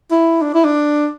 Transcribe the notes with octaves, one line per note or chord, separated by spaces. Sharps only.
E4
D4
E4
D4